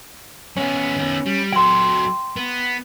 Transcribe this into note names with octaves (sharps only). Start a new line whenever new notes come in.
G#3 B3 C#4
D#3 B3
G3
F#3 A4 G5 C6
B3